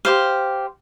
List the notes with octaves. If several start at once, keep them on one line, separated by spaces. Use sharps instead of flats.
G4 C5 F5